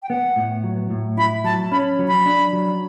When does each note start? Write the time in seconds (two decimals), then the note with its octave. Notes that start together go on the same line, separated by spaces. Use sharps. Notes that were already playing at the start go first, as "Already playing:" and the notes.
0.03 G5
0.09 B3 F#5
0.36 A2
0.64 F#3
0.91 A2
1.17 E4 B5
1.44 F#3 A5
1.72 C#4 B5
1.99 F#3
2.08 B5
2.26 D4
2.53 F#3